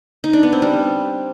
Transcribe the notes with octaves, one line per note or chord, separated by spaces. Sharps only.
D#4
D4
B3
C4
G3